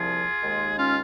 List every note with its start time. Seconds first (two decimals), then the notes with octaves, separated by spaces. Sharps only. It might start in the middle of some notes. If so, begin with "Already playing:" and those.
Already playing: C2 A#2 F3 F4 G#4
0.40 D#2 D#3 G#3
0.78 C#4 F4